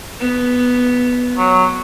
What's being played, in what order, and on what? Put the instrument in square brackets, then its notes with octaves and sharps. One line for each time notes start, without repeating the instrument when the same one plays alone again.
[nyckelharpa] B3
[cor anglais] F#3